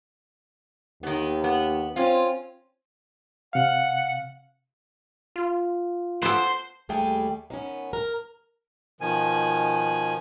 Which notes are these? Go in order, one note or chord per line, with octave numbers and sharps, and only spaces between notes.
D#2 D#3 B3
B3
C4 C#4 F4
C3 F5 F#5
F4
B3 A4 C5
D#2 G3 A3 G#4 G5 A5
D#3 B3 C#4
A#4
B2 D#3 F3 G#5